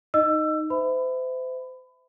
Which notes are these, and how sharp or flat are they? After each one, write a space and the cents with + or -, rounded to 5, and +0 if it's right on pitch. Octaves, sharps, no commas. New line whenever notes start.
D#4 +0 D#5 -10 E6 +20
C5 -35 E5 -10 B5 +25